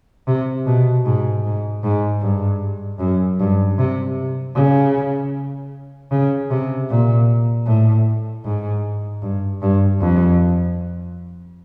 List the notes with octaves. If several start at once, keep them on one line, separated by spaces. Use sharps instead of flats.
C3
B2
G#2
G#2
G#2
G2
F#2
G2
C3
C#3
C#3
C3
A#2
A2
G#2
G2
G2
F2